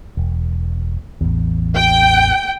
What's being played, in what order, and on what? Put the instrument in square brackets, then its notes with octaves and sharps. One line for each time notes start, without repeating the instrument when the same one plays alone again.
[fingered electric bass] E1
A1 E2
[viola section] G5